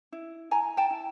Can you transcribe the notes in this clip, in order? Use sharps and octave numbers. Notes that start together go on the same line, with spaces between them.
E4
E4 G#5 A#5
G5 A5
E4